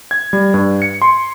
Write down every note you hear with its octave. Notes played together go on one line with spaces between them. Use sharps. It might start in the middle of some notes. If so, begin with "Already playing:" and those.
G#6
G3
G2
C#7
C6